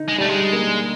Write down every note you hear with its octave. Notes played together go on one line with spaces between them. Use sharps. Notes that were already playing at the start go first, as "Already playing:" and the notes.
Already playing: D3 D#4
G#3
G3 A3
G#3
A#3